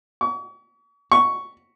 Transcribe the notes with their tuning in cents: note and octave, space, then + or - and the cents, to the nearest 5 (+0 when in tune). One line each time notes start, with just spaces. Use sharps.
C#6 +40
C#6 +5